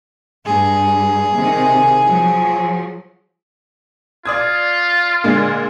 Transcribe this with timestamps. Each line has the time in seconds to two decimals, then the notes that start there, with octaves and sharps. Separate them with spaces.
0.46 G2 G#4
1.34 C3 D#3
2.03 F3 F#3
4.26 F4 D5 D#6 G#6
5.24 A#2 D3 G#3